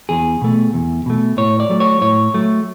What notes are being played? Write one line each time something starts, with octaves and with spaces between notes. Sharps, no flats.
E2 G#4
B2 A3
E2
B2 A3
A2 C#5
D5
F#3 A3
C#5
A2 C#5
F#3 A3